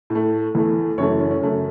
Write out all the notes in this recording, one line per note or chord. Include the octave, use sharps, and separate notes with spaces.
A2
A3
E2 E3 A3
F#2 C#3 E3 A3 C#5
C#4
C#4
F#2 C#3 A3